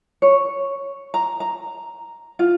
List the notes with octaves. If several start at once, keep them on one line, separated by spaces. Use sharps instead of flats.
C#5
A#5
A#5
F4